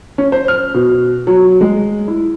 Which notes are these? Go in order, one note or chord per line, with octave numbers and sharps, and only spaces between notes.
C#4
C5
F6
B2
F#3
G#3
E4